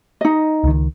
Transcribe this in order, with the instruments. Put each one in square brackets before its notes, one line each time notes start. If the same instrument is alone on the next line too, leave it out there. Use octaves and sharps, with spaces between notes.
[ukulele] D#4 D#5
[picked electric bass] C#2 D#3